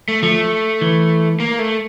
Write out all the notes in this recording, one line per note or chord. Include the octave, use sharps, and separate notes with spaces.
A3
F3 A3
E3
A#3
A3